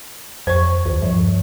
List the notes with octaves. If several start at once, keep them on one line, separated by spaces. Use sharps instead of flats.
F2 C5 C#6
D#2
G2 F3